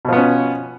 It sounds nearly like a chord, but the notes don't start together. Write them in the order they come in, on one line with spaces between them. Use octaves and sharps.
B2 F3 B3 C#4